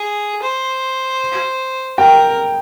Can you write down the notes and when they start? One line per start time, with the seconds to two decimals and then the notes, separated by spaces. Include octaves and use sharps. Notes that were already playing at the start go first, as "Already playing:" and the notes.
Already playing: G#4
0.42 C5
1.98 A#4 G5